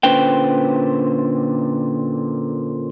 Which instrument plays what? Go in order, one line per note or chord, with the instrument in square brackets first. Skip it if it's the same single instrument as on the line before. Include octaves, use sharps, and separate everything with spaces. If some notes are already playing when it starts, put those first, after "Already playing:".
[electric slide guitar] A#2 D3 C#4 B4 C5 G5